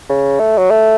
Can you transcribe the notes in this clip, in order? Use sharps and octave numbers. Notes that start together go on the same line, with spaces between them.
C#3
A3
F#3
A3